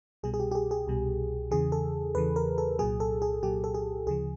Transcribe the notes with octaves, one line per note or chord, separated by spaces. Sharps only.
C2 B2 G3 G#4
G#4
G4
G4
G#4
G#4
C2 B2 G3
E2 C#3 E3 G#4
A4
E2 C#3 E3 B4
A#4
A4
C2 A#2 F#3 G#4
A4
G#4
C2 A#2 F#3 G4
A4
G#4
D2 C#3 F3 G#4